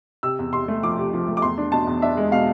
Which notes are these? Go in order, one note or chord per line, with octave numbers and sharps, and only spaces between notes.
C3 E6
E2
C3 C6
A3
F3 D6
C3
F3
A3
D6
E2 C6
D4
B2 A5
E2
D4 E5
G#3
B2 F5